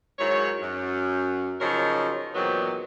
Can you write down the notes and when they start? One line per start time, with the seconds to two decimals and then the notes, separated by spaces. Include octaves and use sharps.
0.19 G#2 D#3 F#3 E4 C#5
0.61 F#2
1.60 C#3 F3 F#3 D#4 A#4
2.35 E2 A#2 D#3 F#3 B3 C4